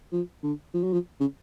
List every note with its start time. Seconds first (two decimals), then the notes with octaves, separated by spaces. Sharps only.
0.12 F3
0.43 D3
0.74 F3
0.83 F#3
0.93 F3
1.20 C#3